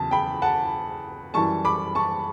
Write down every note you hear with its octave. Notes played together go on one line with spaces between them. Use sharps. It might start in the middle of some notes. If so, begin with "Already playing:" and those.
Already playing: E2 C#3 F#3 A5
G5 B5
F#5 A5
F#2 E3 G3 A5 C#6
B5 D6
A5 C#6